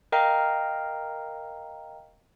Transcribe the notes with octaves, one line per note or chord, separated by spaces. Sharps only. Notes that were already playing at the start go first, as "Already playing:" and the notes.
A#4 D#5 F5 G5 A#5 F6